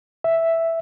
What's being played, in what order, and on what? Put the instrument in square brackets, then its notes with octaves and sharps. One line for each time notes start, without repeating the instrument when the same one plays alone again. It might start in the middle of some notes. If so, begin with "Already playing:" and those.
[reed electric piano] E5